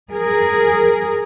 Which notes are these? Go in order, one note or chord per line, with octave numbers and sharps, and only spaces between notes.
G#4 A#4